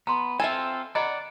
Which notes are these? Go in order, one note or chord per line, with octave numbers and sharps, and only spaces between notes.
B3 A#5 C6
C4 F4 A4 E5 G#5
D5 D#5 F#5 A#5 B5